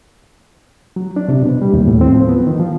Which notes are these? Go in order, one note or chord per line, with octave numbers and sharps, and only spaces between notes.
F#3
D4
C3
B2
G3
D#2
A2
C4
F3
B3
D#3
F3